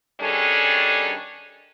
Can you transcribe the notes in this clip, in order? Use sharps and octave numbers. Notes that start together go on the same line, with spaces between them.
D#3 G3 C#4 D4 G#4 A4